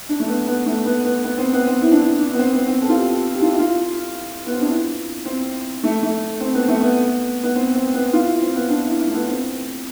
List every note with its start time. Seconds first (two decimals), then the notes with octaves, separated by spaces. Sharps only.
0.09 D4
0.20 A3
0.28 B3
0.47 B3
0.66 A3
0.86 B3
1.05 B3
1.24 B3
1.38 C4
1.53 B3
1.67 C4
1.82 E4
1.92 D4
2.00 E4
2.20 D4
2.33 B3
2.39 C4
2.53 B3
2.67 C4
2.82 A4
2.89 F4
2.96 G4
3.35 G4
3.42 F4
3.51 E4
3.59 F4
4.46 B3
4.54 C4
4.61 D4
4.69 E4
5.26 C4
5.84 A3
6.03 A3
6.40 C4
6.54 B3
6.68 A3
6.81 B3
7.44 B3
7.56 C4
7.75 C4
7.94 B3
8.13 F4
8.27 E4
8.42 C4
8.56 B3
8.70 D4
8.85 E4
8.99 E4
9.08 A3
9.14 B3
9.28 C4